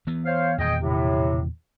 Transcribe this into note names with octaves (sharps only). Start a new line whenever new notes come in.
E3 B3
C5 C#5 F5
E2 A#2 D#3 G#4 D#5 G5
A2 C3